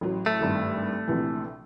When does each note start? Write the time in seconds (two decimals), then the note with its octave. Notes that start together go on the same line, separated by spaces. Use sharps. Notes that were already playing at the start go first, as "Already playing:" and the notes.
0.01 A1 F#3
0.26 A3
0.41 G#1 G2
1.07 A#1 C3 E3